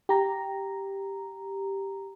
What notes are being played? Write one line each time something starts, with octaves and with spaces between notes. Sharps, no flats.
G4 A#5